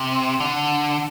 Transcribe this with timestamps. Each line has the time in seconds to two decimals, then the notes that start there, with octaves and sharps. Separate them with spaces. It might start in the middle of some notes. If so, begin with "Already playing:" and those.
Already playing: C3
0.40 D3